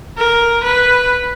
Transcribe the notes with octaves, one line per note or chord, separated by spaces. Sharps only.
A#4
B4